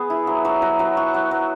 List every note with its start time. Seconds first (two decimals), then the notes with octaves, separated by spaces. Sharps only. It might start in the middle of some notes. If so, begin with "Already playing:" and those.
Already playing: B3 G#4
0.10 E4
0.27 F#3
0.45 F#3
0.62 F#3
0.79 F#3
0.97 F#4
1.14 F#3
1.31 F#3